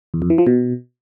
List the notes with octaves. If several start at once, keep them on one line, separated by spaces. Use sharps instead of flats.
E2
F2
E3
F3
B2